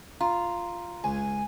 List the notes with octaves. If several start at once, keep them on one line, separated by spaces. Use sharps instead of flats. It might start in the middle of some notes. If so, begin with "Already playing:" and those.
F4 A#5
C#2 G#5